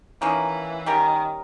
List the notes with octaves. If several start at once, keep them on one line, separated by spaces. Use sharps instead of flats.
D#3 E3 A#3 C#4
D#3 G3 C#4 G4 A#4